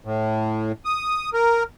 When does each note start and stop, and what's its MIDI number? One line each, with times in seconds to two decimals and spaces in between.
0.05 0.72 45
0.85 1.30 87
1.34 1.63 70